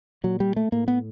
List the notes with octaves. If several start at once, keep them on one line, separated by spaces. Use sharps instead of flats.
A#2 F#3
G3
A3
A2 A#3
B3